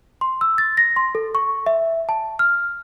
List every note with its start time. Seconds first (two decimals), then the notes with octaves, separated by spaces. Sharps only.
0.21 C6
0.41 E6
0.58 A6
0.77 A#6
0.96 C6
1.15 A4
1.35 C#6
1.66 E5
2.09 A5
2.39 F6